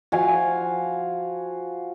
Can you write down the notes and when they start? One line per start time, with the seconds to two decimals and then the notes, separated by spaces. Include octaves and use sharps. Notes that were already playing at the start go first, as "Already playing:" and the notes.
0.12 F3 F#4 F5 G#5